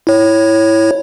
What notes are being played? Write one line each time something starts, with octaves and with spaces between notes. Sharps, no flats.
E4 C#5